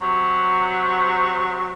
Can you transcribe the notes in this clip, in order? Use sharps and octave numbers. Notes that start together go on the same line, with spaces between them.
C3 F#3